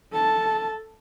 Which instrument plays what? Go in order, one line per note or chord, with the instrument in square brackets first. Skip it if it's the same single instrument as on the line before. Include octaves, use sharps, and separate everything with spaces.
[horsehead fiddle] A4 A5